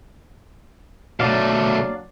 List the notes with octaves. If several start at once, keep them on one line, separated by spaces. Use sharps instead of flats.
B2 F#3 A3 D4 D5 F5